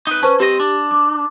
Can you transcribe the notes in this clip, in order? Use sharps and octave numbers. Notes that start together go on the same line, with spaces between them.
D#4 B4
C#4 B4 C5 A5
C4 G4 D#5
D4
D6